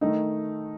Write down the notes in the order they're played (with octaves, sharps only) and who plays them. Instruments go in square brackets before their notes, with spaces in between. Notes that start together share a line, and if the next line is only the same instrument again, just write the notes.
[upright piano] D#3 A3 D#4